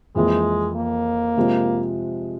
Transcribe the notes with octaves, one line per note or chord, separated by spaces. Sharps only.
F2 E3 G#3 A#3 E4 G#4
A#3
C3 F3 G#3